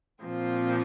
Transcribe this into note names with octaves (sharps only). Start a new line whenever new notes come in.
A#2 F3 C4